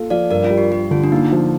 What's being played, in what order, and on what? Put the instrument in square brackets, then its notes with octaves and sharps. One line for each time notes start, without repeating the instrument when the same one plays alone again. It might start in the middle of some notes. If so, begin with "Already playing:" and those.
Already playing: [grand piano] A#3 F4 A4
[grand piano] F3 [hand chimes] D5 F5
[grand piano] G2 [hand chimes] A#4 D5
[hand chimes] F4
[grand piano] G3
[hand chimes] G4
[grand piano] G3 [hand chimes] G4
[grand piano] D3 [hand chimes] F4
[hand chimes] D4
[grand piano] A#3 [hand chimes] D#4
[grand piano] F3